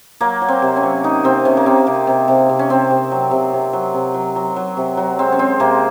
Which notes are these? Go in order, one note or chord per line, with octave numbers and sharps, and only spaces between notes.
F#3 A#3
F#3
C4
C3
C#4
F#3
D#3 D#4
C3 C4
C3 C#4
A#3
C3 C4
C3
C3
C3
C3
C#4
C3 C4
C3
F#3
C3
C3
F#3
C3
F#3
F#3
F#3
C3
F#3
G#3 C4
C#4
G#3 C4
C3 A#3